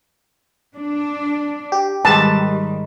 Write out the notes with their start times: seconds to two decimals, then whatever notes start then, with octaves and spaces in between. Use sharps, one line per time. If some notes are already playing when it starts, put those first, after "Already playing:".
0.76 D4
1.72 G4
2.05 G#2 D#3 G3 B4 A5